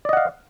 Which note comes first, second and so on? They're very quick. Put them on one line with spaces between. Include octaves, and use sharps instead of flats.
D5 D#5 F#5 F5